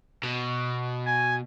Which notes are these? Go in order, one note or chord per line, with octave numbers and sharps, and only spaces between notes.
B2
G#5